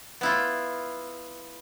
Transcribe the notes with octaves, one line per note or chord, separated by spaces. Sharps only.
B3 E4 F4